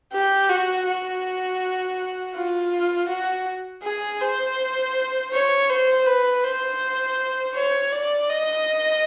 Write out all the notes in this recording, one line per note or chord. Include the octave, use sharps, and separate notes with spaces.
G4
F#4
F#4
F4
F#4
G#4
C5
C#5
C5
B4
C5
C#5
D5
D#5